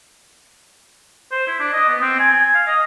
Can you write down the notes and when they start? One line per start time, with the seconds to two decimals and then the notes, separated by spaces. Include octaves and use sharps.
1.31 C5
1.48 E4
1.60 D4
1.73 D#5
1.88 B3
2.01 C4
2.19 G#5
2.34 G#5
2.54 F5
2.67 D#5